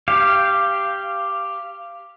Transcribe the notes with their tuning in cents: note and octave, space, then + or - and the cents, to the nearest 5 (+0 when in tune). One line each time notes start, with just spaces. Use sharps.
G4 +0 F5 -15